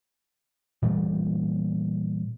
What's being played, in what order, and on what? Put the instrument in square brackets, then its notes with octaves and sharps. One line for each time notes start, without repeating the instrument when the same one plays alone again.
[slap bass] A#2 E3 G3 A3